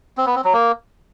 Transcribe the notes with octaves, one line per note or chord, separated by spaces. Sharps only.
C4
B3
C4
F#3
A#3